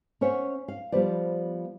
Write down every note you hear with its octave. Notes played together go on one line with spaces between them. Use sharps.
C#4 C5 C#5 E5 F#5
F5
F3 G3 B3 B4 C5 D5